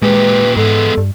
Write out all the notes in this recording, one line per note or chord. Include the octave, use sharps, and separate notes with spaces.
A#2 G#3 G4 B4
G#2 G#3 B3 A4
G2